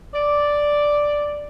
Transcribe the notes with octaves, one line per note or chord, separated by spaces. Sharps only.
D5